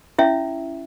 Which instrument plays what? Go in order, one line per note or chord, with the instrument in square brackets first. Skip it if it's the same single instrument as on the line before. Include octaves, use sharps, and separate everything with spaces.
[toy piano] C#4 E4 E5